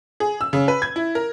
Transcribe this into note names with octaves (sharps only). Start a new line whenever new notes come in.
G#4
E6
C#3
B4
G#6
E4
A#4